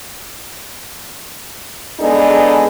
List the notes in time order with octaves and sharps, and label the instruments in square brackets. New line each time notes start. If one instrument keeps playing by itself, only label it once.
[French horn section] G#3 B3 D4 D#4 G#4 A4